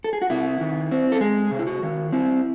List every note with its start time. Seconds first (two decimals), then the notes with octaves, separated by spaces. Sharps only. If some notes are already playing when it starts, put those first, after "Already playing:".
0.04 A4
0.13 G#4
0.22 F#4
0.30 C3 E4
0.61 D#3
0.91 C4
1.12 A4
1.21 G#3 G#4
1.51 C3
1.59 E4
1.67 F#4
1.82 D#3
2.12 C4 E4